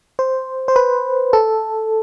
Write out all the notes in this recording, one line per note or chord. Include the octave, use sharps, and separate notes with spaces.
C5
C5
B4
A4